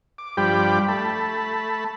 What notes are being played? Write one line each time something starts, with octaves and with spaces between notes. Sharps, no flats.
D6
G2 F3 G3 G4 G5 B5
A3 A5 B5